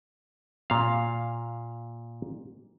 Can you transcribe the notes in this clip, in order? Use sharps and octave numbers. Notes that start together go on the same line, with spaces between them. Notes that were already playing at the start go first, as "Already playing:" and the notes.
A#2 F5